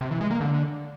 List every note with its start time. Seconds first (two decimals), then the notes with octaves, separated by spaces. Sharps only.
0.01 C3
0.11 E3
0.21 G#3
0.31 A#3
0.41 D3